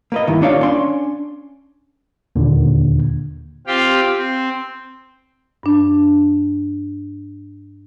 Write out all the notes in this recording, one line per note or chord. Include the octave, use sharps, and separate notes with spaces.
A#3 B4 D#5
G2 D#3 E4
A#3 D4 F4 C#5 D5 F5
C#4 D4 D5 C6
D#2 A#2 D3
C4 F4 G4 F5 G5
C4
G2 D4